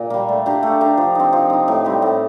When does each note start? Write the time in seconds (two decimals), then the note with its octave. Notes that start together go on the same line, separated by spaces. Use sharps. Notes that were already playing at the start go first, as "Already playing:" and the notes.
Already playing: A#2
0.10 G3 A#3
0.29 A3
0.46 D4 G4 A#4
0.63 A3
0.81 D4 G4 A#4
0.98 F3
1.15 C4 D#4
1.33 F3
1.50 C4 D#4
1.68 A2
1.85 G3 C4 G4
2.02 A2